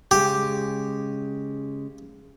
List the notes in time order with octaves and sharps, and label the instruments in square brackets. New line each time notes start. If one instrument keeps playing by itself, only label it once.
[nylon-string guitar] C#3 G#3 [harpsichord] G4